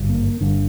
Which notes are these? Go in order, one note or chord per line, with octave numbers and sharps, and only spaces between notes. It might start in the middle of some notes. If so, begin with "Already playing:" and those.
Already playing: G#1 G2 D3
A#3
G1 G2 D3